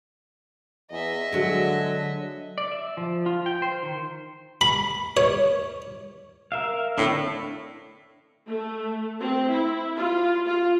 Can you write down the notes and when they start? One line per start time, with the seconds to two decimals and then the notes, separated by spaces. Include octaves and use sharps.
0.90 E2 D#5 E5
1.33 D3 F#3 G#3
2.58 D5
2.71 E5
2.97 F3
3.26 F4
3.46 G5
3.62 C5
3.83 D#3
4.61 B5
5.17 C#5
6.52 A#4 E5 F5
6.98 A2 D3 C4 D4
8.48 A3
9.20 C4
9.50 E4
9.97 F4
10.45 F4